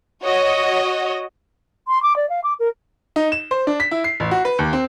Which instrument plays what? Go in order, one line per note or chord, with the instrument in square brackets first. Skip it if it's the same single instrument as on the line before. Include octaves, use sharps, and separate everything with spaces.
[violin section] F#4 C#5 D#5
[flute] C6
D6
D5
F5
D6
A#4
[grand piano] D#4
E7
C5
D4
B6
E4
C7
A1
F#4
B4
D#2
C4